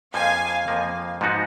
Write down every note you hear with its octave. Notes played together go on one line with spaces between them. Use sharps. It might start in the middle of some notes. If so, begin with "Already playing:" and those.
F2 F3 A#3 F5 G#5
F2 F3 A#3
G#2 F3 B3 D#4 F#4